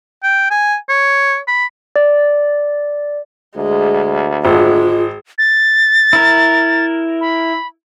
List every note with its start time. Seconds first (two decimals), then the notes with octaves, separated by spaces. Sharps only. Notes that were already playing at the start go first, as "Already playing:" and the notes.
0.23 G5
0.51 G#5
0.89 C#5
1.48 B5
1.96 D5
3.56 D2 G#3
4.45 G#1 G#3 F4
5.38 A6
6.13 E4 A#4
7.21 B5